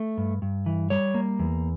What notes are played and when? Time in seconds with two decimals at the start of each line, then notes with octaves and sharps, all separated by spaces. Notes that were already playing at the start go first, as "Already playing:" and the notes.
Already playing: A3
0.18 G2
0.42 G2
0.66 E3
0.90 G3 C#5
1.14 A#3
1.39 E2